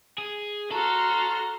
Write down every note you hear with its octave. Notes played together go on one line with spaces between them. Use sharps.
G#4
F#4 A4 A#5 C6 F6